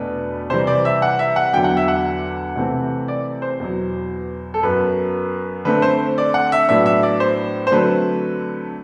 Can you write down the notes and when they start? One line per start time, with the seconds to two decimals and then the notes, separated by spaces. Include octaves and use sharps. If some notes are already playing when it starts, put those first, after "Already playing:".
Already playing: E2 B2 A3 D4 B4
0.50 C3 E3 G3 C5
0.67 D5
0.85 E5
1.02 F#5
1.19 E5
1.36 F#5
1.53 E2 D3 F#3 G5
1.64 F#5
1.77 E5
1.88 F#5
2.56 C3 E3 A3 C4
3.08 D5
3.42 C5
3.60 E2 B2 F#3
4.54 A4
4.63 F#2 F#3 B3 B4
5.65 D3 A3 C4 B4
5.82 C5
6.18 D5
6.34 F#5
6.52 E5
6.69 A2 F#3 B3 D4 E5
6.86 E5
7.03 D5
7.20 C5
7.67 C5
7.72 D3 F#3 A3 C4 B4